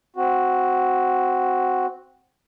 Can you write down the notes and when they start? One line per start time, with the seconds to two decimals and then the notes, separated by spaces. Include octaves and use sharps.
0.16 C4 F#4